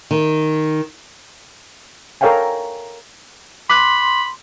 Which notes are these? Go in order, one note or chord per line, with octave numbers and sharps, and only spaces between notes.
D#3
A4 A#4 C#5 F5 G5 G#5
B5 C6 D6 F#6